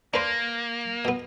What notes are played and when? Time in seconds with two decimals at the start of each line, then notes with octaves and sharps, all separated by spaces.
0.14 A#3 D4 B4 C5
1.05 B2 B3